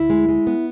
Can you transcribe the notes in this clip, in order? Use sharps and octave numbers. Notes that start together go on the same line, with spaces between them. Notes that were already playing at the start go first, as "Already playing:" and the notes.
Already playing: D2 E4
G#3
G#3
B3